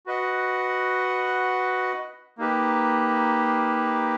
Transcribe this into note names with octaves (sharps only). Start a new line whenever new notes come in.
F#4 B4 D#5 F#5
A#3 D#4 G4 B4